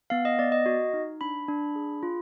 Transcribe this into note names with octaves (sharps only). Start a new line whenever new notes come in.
B3 F5
D#5
B3 D5
D#5
F#4
D#4
D4 B5
D4
G#4
F4